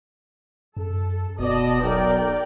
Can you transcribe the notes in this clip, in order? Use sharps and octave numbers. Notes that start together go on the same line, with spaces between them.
F#2 A4
E1 B2 D5 D#5 A5
B1 A#4 D5 G5